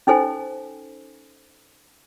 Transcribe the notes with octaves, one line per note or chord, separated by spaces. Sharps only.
C#4 D#4 A4 C5 G#5